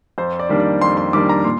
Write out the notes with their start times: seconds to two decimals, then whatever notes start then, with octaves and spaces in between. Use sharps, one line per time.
0.18 F2 C5
0.39 D5
0.49 D#3 G3 A#3 D4
0.60 D5
0.81 F2 C6
0.97 C6
1.13 D#3 G3 A#3 D4 D6
1.29 A#5
1.45 A#2 C6